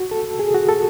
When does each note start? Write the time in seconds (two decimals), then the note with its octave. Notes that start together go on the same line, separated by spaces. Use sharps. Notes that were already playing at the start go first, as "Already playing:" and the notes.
Already playing: F#4
0.11 A4
0.39 G#4
0.54 F#4
0.69 A4